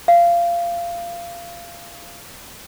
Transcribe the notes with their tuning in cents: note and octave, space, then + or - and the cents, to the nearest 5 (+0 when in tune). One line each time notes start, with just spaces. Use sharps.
F5 -20